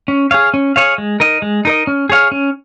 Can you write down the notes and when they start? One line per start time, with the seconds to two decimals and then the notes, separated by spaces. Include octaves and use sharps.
0.08 C#4
0.31 G#4 C#5 F5
0.54 C#4
0.76 G#4 C#5 F5
0.98 G#3
1.20 D#4 A#4 D#5
1.42 G#3
1.65 D#4 A#4 D#5
1.87 C#4
2.10 G#4 C#5 F5
2.32 C#4